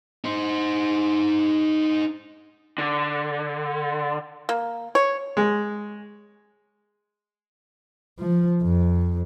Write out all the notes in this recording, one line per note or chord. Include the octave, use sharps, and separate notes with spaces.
D#4 C5
D3
A#3
C#5
G#3
F3
F2